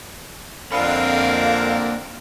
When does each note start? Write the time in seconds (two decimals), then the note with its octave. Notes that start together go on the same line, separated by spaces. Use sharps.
0.72 F2 D3 A#3 C4 D4 A#4 F5 B5